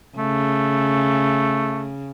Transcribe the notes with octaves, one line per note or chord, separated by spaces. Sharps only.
C#3 A3